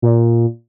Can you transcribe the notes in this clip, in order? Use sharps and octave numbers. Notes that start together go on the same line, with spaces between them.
A#2